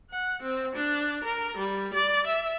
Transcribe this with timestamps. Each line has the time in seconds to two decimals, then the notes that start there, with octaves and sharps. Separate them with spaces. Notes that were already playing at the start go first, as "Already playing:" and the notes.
0.10 F#5
0.42 C4
0.75 D4
1.24 A#4
1.57 G3
1.94 D5
2.27 E5